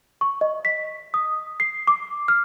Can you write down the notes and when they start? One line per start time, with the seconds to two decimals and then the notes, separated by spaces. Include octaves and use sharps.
0.21 C#6
0.41 D#5
0.65 B6
1.14 D#6
1.60 C7
1.87 D6
2.28 F6